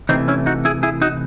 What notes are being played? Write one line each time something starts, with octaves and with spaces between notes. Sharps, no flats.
C3 E3 A3 C4 D#4
C#4 E4
D#4 F#4
E4 G#4
E4 G#4
D#4 F#4